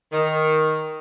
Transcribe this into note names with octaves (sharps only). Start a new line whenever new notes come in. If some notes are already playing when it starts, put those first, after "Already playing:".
D#3